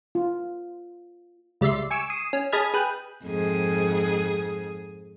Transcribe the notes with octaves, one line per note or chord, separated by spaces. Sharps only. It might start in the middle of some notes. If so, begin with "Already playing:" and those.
F4
C#2 G3 D5 E5 C6
G#5 C#6 D6 E6
D#6 C7 E7
C#4
G#4 D#5 A5 B5 F6 G#6
G#4 B4 G5
F2 G#2 G#4